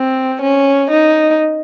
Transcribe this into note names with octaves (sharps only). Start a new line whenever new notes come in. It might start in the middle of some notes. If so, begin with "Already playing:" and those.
Already playing: C4
C#4
D#4